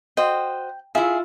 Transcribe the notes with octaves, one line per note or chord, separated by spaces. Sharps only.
F#4 C5 D#5 G5
E4 F4 G#4 E5